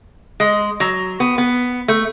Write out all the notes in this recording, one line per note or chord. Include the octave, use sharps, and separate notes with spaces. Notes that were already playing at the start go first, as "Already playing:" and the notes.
G#3
F#3
B3
B3
A3